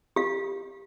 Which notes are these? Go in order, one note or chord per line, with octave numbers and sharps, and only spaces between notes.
G4 F5